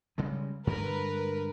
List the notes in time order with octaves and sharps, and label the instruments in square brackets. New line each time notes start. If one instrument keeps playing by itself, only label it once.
[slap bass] C#3 G3 G#3
[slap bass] G2 D3 G#3 [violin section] A#4 B4